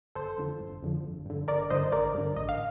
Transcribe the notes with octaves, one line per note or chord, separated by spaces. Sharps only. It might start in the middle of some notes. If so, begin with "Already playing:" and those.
G1 A4 C5
F2 D3 F3
G1
F2 D3 F3
G1
G2 D3
G1 A#4 D5
G2 D3 C5 D#5
A1 A#4 D5
G2 D3
A1 D#5
F5